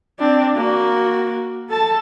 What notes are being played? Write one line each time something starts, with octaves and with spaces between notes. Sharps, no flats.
C4 D4
A#3 F#4
A4 A5